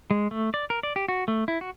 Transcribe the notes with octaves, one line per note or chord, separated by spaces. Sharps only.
G#3
A3
D5
A#4
D5
G4
F#4
A3
E4
F#4